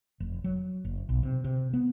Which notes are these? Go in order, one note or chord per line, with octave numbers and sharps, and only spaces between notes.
F1
F#3
F#1
B1
C3
C3
B3